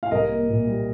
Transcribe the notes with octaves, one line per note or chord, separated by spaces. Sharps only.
F5
C2 A#4 D#5
A#3
A#2
G3